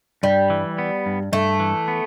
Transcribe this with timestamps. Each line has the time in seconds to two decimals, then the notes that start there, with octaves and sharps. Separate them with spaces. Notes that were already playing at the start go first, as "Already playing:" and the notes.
0.23 G2 G3
0.50 E3
0.78 B3
1.06 G2
1.32 G2 A3
1.60 E3
1.88 B3